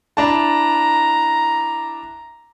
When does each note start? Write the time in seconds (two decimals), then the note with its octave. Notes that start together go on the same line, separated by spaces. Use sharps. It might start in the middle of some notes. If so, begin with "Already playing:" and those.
0.17 D4 E4 A5 A#5